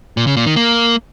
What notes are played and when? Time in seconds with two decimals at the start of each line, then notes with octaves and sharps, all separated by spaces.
0.17 A#2
0.27 C#3
0.37 A#2
0.46 D#3
0.56 A#3